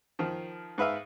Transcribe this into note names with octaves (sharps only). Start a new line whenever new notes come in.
D#3 F3
G#2 B4 E5 F5